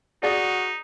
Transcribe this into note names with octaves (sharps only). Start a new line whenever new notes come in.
D#4 F#4 G#4 D5